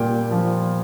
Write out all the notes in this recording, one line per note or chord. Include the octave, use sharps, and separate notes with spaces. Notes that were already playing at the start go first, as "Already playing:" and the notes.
Already playing: A#2 G3 G5
F3